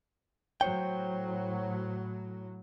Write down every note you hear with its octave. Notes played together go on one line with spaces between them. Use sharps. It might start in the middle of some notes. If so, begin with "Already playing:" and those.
A2 F#3 C5 C#5 G5